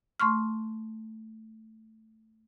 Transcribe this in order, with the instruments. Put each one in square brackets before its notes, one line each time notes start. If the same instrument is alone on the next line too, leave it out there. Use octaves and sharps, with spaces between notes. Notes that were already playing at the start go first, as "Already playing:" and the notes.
[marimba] A3 C6 C#6 F6